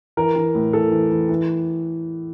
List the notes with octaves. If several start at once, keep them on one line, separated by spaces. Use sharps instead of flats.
E3 A#4
E3
A2
E3 A4
E3
E3
E3